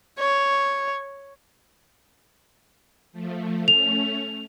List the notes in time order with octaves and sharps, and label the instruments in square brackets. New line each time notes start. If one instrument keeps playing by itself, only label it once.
[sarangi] C#5
[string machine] F3 A3
[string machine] A3 C#4 [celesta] F7